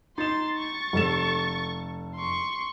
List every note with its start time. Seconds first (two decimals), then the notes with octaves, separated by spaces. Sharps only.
0.18 D#4 C6 A6 E7
0.57 C#6 A6
0.93 F1 A4 E7
2.16 C6 C#6